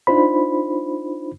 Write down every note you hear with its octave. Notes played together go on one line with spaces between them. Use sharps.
D4 D#4 F4 C5 B5